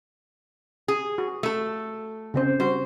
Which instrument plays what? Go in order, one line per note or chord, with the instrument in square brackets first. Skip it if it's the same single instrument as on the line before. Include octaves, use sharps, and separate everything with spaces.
[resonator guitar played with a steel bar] G#4
[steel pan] F#4
[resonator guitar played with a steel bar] A3 A4
[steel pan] C#3 C4 C5
[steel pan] G3 F#4 [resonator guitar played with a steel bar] C5